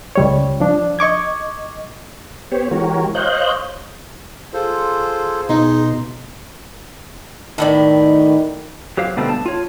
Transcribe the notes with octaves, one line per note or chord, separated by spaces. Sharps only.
C#2 G3 C#5
F3 D4
D#5 C#6 D6 G#6
B3 G4 C5 C#5
E3 G#3 F#4 G4 A#4 C#5
C5 C#5 D#5 F5 F#6 G6
F4 G#4 A4 C5
B2 D#4 C6
A2 D#3 B3 D5
F#3 G4 C5 F5
B2 D3 G3 A3 B3 C4
A5
F4 C#5